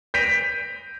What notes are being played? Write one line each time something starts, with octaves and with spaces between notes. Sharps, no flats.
G6 A#6 B6 D7 D#7 F7